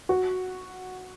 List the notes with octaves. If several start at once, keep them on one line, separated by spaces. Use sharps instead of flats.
F#4